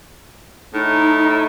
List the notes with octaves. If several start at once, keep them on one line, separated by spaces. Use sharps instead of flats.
A2 D#4